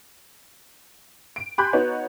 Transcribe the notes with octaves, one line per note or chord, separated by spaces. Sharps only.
D7
G4 G#5 B5 C6 F#6 G6
B3 D#4 F#4 B4 C#5